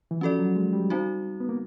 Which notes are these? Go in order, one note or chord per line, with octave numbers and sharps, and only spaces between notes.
E3
F3 C#4 F#4 A4 D5
F#3
G#3
G3
G3 C4 D#4 F#4
B3
A#3